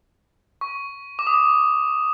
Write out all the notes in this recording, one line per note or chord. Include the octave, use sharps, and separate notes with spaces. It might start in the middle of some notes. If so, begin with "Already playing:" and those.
C#6
D6
D#6
D6